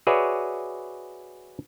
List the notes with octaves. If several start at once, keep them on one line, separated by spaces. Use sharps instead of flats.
F#4 G#4 B4 C#5 D5 E5